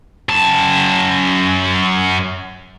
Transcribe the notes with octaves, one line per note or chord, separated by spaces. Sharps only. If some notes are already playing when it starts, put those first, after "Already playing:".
F#2 A5